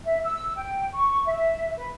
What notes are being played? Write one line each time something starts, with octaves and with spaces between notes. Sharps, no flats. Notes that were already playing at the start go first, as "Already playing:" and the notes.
E5
E6
G5
C#6
E5
B4